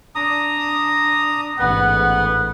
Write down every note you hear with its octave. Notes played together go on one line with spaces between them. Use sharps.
D4 A#5 D#6
A1 G#2 B3 F#5